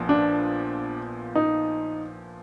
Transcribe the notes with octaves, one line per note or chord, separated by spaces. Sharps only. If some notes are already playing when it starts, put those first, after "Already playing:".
Already playing: A#1 A#2 F3 B3
D4
D#4